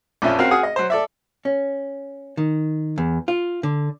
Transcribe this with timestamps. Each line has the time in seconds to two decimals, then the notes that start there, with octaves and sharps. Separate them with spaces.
0.22 A#1 F2 F3 C#4 E5 A5
0.39 C4 C#4 F#4 A#4 F5
0.51 F#4 G#4 F#5 D#6 F6
0.63 D#5
0.76 F#3 C5
0.90 A4 D5 E5
1.45 C#4
2.37 D#3
2.98 E2
3.28 F4
3.63 D3